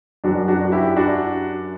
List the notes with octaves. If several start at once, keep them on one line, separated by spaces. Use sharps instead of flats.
F#2 F#3 D4 F#4
D4 F#4
F#4
E4 G4
D4 F#4